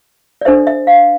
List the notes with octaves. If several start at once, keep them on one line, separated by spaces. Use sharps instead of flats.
D5
D4 A4 C5 E5
E5
F5